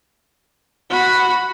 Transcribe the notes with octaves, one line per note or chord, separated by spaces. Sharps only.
F#4 B5